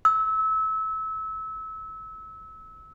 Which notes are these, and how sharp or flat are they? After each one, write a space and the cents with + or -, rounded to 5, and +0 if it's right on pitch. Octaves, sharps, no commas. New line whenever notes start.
E6 -25